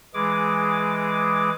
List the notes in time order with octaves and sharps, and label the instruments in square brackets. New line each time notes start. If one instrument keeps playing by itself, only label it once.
[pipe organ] E3 G#3 G#4 D6